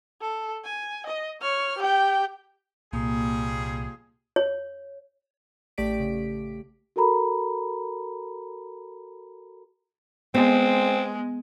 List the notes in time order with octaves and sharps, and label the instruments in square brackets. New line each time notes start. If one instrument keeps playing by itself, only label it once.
[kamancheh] A4
G#5
D#5
C#5 F6
G4 G5
[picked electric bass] C2 A#2 [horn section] F3 G3 G#4 [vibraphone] A#3
[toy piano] C#5
[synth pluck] A1 A3 G4 D5 B6 D7
C#3
[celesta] F#4 A4 A#4 A#5 B5
[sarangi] G#3 [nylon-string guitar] B3 [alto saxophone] C4